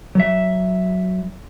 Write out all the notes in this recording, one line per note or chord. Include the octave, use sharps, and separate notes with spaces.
F#3 E5